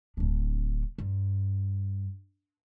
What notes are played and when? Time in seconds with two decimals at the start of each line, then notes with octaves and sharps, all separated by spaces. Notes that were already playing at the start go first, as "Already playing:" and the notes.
0.17 D1 D4
0.98 G2